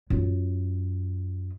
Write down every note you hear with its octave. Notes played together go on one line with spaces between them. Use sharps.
F#2 F4